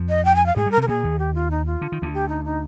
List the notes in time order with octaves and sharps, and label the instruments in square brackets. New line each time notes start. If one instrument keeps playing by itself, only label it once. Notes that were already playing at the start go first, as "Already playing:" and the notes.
Already playing: [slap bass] F2 F3
[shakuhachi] D#5
G5
G#5
F5
[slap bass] G#2 G#3 [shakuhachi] G#4
[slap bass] G2 G3
[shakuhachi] A#4
[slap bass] C3 C4
[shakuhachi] A#4
[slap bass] A#2 A#3 [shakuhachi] G#4
[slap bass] D#2 D#3
[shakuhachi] G4
F4
D#4
F4
[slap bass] D3
D#3
D2 D3
[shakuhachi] G4
D#4
D#4